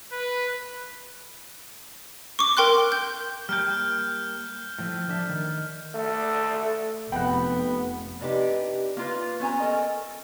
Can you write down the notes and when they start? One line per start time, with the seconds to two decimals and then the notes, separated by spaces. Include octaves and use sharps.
0.12 B4
2.39 C#6 D6
2.57 A#4 G5 C6 F#6
2.92 G6
3.49 G3 A#3 G5 F6 G6
4.79 A2 F3 A3
5.08 F3 D4 E5
5.29 D#3
5.95 A3
7.12 F1 B3 F#5 G5 B5
8.20 C3 D4 D#4 G4 B4
8.97 A#3 F4 B4
9.40 B3 C#4 C5 G#5 A#5
9.60 A4 A#4 D#5